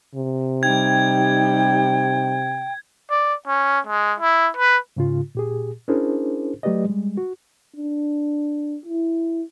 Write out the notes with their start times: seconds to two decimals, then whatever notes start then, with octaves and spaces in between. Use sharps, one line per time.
0.15 C3
0.63 G3 D#4 G5 G#6
3.10 D5
3.47 C#4
3.87 G#3
4.20 E4
4.57 B4
4.97 G#2 C#3 F4
5.35 A#2 G4 G#4
5.88 C#4 D4 E4 G#4 A#4 C5
6.63 F#3 A3 G4 B4 D5 D#5
6.85 G3 G#3
7.17 F#4
7.76 D4
8.85 E4